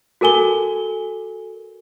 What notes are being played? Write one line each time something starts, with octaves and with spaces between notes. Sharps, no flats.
F#4 A4 A#4 G#5 G7